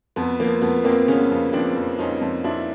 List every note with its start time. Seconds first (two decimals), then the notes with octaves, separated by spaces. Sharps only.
0.16 F2 B3
0.40 F3 A#3
0.61 F2 B3
0.84 F2 A#3 C4
1.08 C#3 B3 C#4
1.31 F2
1.53 F3 C4 D4
1.76 F2
1.99 F2 C#4 D#4
2.21 F2
2.44 F2 D4 E4